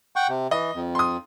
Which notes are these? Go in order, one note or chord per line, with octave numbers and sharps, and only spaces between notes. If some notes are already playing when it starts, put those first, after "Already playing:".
F#5 G5 C#6
C3
E3 D#5
F2
C6 D#6